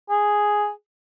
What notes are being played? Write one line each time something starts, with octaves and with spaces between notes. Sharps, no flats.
G#4